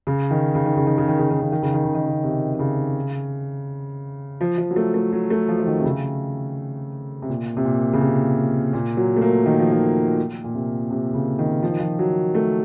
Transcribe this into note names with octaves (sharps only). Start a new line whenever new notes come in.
C#3
D#3
C#3
D#3
C#3
D#3
C#3
D#3
C#3
D#3
C#3
D#3
C#3
D#3
C#3
D#3
C#3
C3
D#3
C#3
F3
F3
F#3
A3
A3
F#3
A3
F3
F3
D#3
C3
C#3
C3
A#2
C3
A#2
C#3
C3
A#2
F#3
A3
A#3
D#3
F3
D#3
A#2
C3
C3
C#3
D#3
F3
D#3
F3
F#3
A3